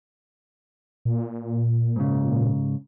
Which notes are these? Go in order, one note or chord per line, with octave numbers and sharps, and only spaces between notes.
A#2
G#2 C#3